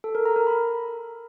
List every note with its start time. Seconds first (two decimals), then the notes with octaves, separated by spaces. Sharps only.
0.04 A4
0.15 A#4
0.25 A#5
0.36 A#4
0.47 B5